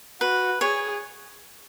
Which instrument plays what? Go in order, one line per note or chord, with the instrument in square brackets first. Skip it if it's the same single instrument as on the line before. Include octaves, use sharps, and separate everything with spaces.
[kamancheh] F#4 [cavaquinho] B4
[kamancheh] G#4 [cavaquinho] C#5